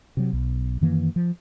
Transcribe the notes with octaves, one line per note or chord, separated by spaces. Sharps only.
C3 F#3
B1
F#2 D#3 E3 A#3
F3